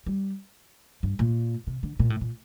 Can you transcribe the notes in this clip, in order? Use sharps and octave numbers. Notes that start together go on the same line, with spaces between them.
G3
G2
A#2
C3
D3
A#2
A2
A#2